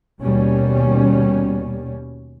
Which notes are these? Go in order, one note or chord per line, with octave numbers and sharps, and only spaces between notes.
D#2 B2 G3 C#4